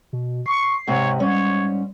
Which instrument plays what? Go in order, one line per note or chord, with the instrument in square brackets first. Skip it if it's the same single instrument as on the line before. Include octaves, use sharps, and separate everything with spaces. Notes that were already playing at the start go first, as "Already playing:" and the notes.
[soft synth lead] B2
[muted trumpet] C#6 [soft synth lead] C7
[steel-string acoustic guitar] G#2 C3 [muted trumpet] C#5
[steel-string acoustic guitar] G#2 C#4 [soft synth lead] G3 [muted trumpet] C#5